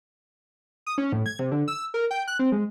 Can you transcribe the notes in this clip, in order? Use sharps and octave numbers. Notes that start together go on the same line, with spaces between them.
D#6
C#4
A2
G#6
C3
D3
E6
A#4
G5
F#6
C4
G#3